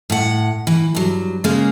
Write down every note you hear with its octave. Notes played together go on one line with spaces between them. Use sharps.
A2 F#5
E3
G2 F#3
C#3 G#3 A#3 C#4